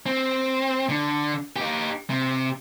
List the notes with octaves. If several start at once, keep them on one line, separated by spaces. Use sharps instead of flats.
C4
D3
D#4 G4
C3